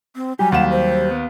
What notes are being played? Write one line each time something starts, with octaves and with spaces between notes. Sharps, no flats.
C4
F#3 G3 G4 G#5
D#2 F#5 E7
C5
B3